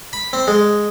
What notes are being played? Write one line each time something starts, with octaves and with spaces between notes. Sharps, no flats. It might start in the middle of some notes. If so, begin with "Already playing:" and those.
B5
C4
G#3